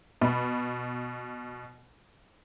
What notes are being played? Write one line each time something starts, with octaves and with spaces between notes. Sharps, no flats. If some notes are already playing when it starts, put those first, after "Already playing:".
B2 B5